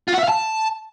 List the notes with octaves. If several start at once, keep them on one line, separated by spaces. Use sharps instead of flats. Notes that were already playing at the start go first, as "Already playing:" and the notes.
F4
F#4
E5
F5
A5